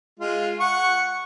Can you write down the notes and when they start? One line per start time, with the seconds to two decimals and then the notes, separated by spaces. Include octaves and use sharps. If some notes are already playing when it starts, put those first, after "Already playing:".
0.20 G#3 F4
0.60 F#5 C#6